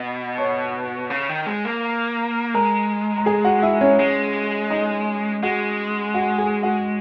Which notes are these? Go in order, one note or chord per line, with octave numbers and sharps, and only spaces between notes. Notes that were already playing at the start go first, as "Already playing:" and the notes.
Already playing: B2 D#5
C#5 C#6
C#3
D#3
G#3
A#3
G#3 A#4 A#5
A#5
G#4 G#5
F#4 F#5
E4 E5
C#4 C#5
G#3
D#4 D#5
G#3 F#4 F#5
F#4 F#5
G#4 G#5
F#4 F#5